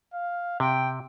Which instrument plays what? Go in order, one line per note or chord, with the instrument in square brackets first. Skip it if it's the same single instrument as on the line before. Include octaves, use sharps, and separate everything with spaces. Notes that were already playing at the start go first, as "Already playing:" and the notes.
[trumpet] F5
[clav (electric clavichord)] C3 [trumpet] G5